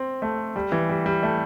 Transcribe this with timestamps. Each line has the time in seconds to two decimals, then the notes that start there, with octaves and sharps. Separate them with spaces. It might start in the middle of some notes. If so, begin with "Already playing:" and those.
Already playing: C4
0.22 A3
0.56 G3
0.72 E3
0.89 G3
1.06 G3
1.23 A3